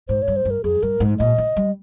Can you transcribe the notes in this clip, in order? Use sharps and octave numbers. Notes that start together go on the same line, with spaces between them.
G#2 C5
C#5
G2
C5
G2
A#4
F2 G#4
G2 A#4
G#2
A#2 D#5
C#3
G3